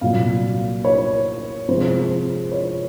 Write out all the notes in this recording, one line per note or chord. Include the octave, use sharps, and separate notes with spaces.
C2 A#2 F#3 F5
C#5
C3 F3 G#3 C5
C#5